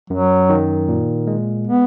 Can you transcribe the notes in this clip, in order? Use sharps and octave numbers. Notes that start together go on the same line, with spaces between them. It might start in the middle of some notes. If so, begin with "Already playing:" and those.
F#2 F#3
D#3
A#2
G#3
B3